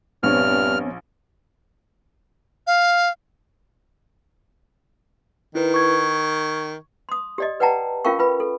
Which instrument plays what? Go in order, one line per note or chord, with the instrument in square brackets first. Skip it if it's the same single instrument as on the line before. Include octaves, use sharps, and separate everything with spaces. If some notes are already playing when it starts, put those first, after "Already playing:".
[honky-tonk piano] A#1 [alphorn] G2 [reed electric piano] B3 C4 C#5 [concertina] F6
[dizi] F5
[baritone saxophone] D#3 [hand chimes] E4 B4
[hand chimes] C#6 G#6
[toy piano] C6 D#6
G4 D5 D#5
B4 D5 F#5 G5 A5 A#5
C#4 F4 A#4 F5 G5 C#6
F4 B4 B5
A4